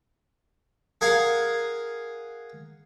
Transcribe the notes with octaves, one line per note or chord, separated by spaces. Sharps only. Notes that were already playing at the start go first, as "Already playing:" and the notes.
G#4 A#4 F5 F#5 G#5